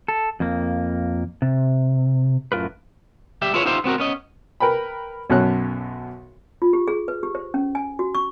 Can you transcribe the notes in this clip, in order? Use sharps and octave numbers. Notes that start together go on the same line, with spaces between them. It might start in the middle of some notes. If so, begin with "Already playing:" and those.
A4
F2 A#3
C3
F#2 A2 F4 A#4 B4
G3 G4 E5
E4 F4 G#4 B4 C#5
B3 D#4 F4 G4 C5 E5
B3 C4 F#4 A#4
B3 C#4 D#5
A#4 B4 G5 B5
B1 F#2 A4 C#5 F#6
F4
G4
G#4
B4
G4
C5
C#4
G#5
F#4
C#6